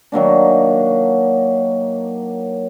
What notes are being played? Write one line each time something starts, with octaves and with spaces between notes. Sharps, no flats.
D#3 F#3 A#3 D4